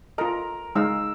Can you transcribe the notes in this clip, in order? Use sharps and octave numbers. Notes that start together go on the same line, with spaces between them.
F4 A4 A#4 D#5
G#3 D#4 F5 E6